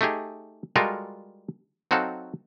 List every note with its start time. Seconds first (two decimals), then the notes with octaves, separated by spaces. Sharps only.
0.01 A3 D#4 G4 G#4
0.76 G3 G#3 F4 F#4 A4 A#4
1.91 F#3 C4 D#4 F#4 A4 F5